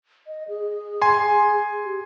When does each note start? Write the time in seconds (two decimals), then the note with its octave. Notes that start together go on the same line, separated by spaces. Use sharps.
0.27 D#5
0.48 G#4
1.02 G#5 C6
1.85 G4